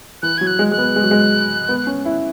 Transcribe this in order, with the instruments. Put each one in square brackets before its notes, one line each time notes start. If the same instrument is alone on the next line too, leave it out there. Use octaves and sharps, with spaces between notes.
[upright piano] E3 [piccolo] F#6
[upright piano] F#3 [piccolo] G#6
[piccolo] F#6
[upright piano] G#3
[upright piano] G#3 [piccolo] F#6
[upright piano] B3
G#3
F#3
G#3
B3
C#4
E4